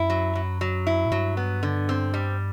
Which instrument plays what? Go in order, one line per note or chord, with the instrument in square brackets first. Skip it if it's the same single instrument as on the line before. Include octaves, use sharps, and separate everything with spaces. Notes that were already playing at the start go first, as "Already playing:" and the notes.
Already playing: [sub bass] F#2 [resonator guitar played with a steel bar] E4
[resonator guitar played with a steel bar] F#3
F#3
F#3
E4
[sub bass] A2
[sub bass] G2 [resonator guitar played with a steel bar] F#3
[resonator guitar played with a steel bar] B3
D3
C4
G3